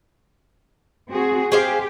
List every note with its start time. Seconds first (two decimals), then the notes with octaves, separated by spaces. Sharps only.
1.11 C4 F#4 G#4
1.52 G4 G#4 C5 F5